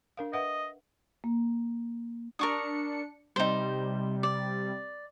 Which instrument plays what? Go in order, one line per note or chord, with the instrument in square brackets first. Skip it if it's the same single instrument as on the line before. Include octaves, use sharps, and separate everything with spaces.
[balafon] D4 A#4 F5
[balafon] B4 E5 F#5 [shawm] D#5
[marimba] A#3
[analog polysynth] D4 C#7 [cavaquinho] A#4 C#6 D#6
[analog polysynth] C3 G3 [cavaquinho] D#4 C5
[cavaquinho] D5